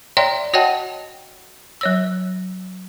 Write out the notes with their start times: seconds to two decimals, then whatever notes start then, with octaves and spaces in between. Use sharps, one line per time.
0.17 C#5 D5 E5 G5 A#5 C6
0.54 F#4 C#5 D#5 F#5 G5 A5
1.81 F#3 C#5 E6